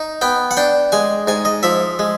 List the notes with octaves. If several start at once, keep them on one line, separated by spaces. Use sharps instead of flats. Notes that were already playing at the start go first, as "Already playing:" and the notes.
Already playing: D#4
B3 G5
F#5
D4 G5
G#3 G#5
G#2 G#5
D#5
F3 E5
G#3